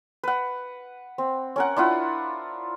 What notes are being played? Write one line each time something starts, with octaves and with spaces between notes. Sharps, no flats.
B4 F#5
C4
C#4 A#4 F#5
D4 E4 F4 F#5